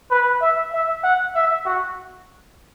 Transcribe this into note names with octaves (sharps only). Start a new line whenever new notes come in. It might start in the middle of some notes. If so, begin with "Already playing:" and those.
B4
E5
E5
F#5
E5
F#4